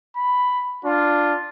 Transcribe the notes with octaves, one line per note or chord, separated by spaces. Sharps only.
B5
D4 F4